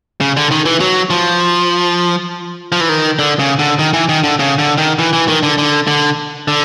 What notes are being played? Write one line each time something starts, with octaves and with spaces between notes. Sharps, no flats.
C#3
D3
D#3
E3
F#3
F3
F3
E3
D#3
D3
C#3
D3
D#3
E3
D#3
D3
C#3
D3
D#3
E3
E3
D#3
D3
D3
D3
D3